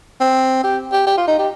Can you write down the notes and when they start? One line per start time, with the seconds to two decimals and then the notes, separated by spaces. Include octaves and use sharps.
0.21 C4
0.64 G4
0.93 G4
1.07 G4
1.18 F4
1.28 D#4
1.39 G4